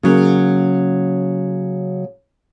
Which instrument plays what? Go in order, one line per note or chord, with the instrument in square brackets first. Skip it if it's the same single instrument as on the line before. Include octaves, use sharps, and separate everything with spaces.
[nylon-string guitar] C#3 F#3 A#3